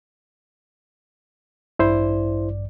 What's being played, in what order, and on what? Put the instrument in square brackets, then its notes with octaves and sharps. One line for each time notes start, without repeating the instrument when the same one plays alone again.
[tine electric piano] A1 G2 D5 [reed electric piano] E4 C5